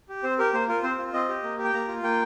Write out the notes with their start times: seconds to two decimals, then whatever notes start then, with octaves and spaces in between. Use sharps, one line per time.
0.09 G4
0.23 C4 C5
0.39 G4 A#4
0.53 A#3 C5
0.68 F4 A#4
0.83 C4 C5
0.99 F4
1.13 C4 D#5
1.29 G4
1.43 A#3
1.58 G4
1.64 G5
1.73 A#3 A#5
1.88 F4
2.03 A#3 G5